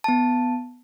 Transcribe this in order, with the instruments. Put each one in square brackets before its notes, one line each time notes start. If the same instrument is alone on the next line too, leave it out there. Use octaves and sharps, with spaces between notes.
[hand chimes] B3 A5